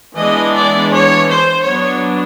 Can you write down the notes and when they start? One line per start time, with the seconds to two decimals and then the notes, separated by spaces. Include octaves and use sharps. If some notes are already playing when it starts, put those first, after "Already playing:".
0.18 E3 G#3 B3 D4 D#5
0.56 D5
0.92 C#5
1.29 C5
1.65 F#3 B3 D4 C#5